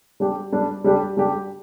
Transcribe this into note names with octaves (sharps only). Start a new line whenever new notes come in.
G3 D4 G4
G3 D4 G4
G3 D4 G4
G3 D4 G4